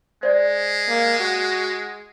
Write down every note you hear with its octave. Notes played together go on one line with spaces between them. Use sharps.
G#3 C5 D5
A#3
F#4